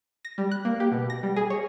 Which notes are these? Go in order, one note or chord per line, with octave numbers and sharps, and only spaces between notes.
A#6
G3
F#6
A#3
G4
B2
A#6
G3
G#4
C#5